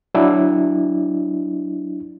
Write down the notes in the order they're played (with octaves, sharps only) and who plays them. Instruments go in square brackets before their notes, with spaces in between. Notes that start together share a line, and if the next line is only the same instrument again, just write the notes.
[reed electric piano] F#3 D4 E4